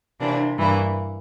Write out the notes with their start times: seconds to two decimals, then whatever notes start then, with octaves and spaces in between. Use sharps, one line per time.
0.20 C3 E3 A#3 D4
0.58 G2 E3 A#3 E4